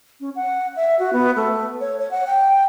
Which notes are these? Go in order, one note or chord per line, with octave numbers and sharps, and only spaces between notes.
C#4
F#5
E5
F#4
B3
A3
C#5
C#5
F#5
G5